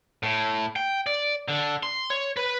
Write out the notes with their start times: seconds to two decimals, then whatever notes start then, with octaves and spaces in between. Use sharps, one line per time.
0.23 A2
0.76 G5
1.07 D5
1.48 D3
1.83 C6
2.10 C#5
2.37 B4